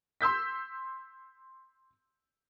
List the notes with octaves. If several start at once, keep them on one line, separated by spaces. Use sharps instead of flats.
C6 E6 G6 B6